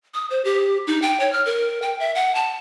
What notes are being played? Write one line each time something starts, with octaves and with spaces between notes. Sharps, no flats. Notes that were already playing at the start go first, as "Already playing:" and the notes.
D#6
C5
G4
D#4
G5
C#5
F6
A#4
G5
E5
F#5
A5